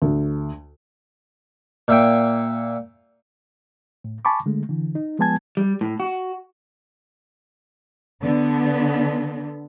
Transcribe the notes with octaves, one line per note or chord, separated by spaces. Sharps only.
D2
A#2 E5 G5
A2
G#5 A5 B5 C#6 D6
D3 G#3 A3
D3 E3
D#4
F3 G#3 B3 G#5 A5 G#6
G3
A2
F#4
D3 B3